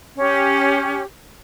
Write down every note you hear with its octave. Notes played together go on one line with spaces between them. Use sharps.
C#4 G4